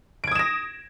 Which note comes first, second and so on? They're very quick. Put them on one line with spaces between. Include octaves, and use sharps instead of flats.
D7 G#6 D#6 E7 A#6